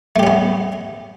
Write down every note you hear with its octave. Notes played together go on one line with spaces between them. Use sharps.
A3 B3 C#4 G4